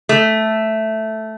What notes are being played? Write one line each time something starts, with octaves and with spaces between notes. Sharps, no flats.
A3